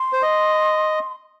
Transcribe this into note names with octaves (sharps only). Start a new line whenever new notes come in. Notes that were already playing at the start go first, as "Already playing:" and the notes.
Already playing: C6
C5
D#5